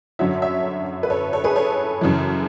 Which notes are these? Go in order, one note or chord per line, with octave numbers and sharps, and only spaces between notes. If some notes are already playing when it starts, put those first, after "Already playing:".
F#2 D3 F#3 C#5 E5
C#5 E5
B4
A4 C#5
A4 C#5
G#4 B4
A4 C#5
F#2 C#3 E3